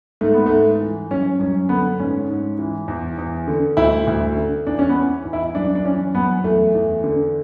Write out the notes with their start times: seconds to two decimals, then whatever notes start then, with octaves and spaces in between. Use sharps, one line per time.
0.21 G#2 A3
0.34 B3
0.46 G#2 A3
0.81 E3
1.10 F#2 C#4
1.39 F#2 C#4
1.69 D3 B3
1.99 G#2 C#4
2.28 G#2
2.59 E3
2.88 E2
3.18 E2
3.48 D3
3.77 D2 E4
4.07 D2
4.36 D3
4.66 E2 D4
4.79 C#4
4.89 B3
4.96 E3
5.25 E2
5.33 E4
5.55 F#2 D4
5.75 D4
5.85 E3 C#4
6.14 F#2 B3
6.44 E2 A3
6.75 E2
7.04 D3